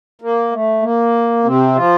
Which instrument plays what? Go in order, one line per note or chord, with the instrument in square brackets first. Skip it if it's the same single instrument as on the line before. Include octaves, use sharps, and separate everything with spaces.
[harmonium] A#3
A3
A#3
C3 C4
F3 F4